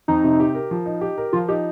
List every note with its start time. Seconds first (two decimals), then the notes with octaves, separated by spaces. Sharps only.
0.08 F2 D#4
0.24 C3
0.40 G4
0.54 A#4
0.71 F3
0.86 D#4
1.01 G4
1.18 A#4
1.33 F3 F4
1.48 D#4 G4